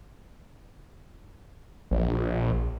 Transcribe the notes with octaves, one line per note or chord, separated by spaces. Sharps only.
A#1